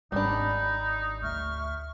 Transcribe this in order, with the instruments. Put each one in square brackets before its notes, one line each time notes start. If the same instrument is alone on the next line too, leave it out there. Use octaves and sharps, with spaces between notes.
[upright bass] G#1 [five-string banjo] G3 D4 [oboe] D#4 [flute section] B5
[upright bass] D2 [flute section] E5 C#6 F6